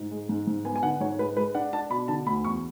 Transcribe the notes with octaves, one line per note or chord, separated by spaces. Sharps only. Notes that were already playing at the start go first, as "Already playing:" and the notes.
Already playing: G#2
G#3
G#2
G#2
B3 G#5
G#5
D3 F#5
G#2 C#5
G#3 B4
G#3 B4
D4 F#5
D4 A5
B2 B5
D3 A5
D2 B5
E2 C#6